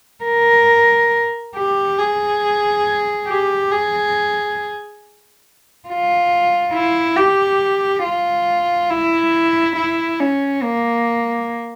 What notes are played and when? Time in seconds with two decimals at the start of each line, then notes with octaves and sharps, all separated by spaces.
0.25 A#4
1.56 G4
1.99 G#4
3.28 G4
3.71 G#4
5.88 F4
6.74 E4
7.17 G4
8.04 F4
8.91 E4
9.77 E4
10.20 C#4
10.63 A#3